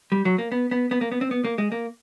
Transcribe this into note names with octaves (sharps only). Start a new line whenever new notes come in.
G3
F#3
A#3
B3
B3
B3
A#3
B3
C4
B3
A#3
G#3
A#3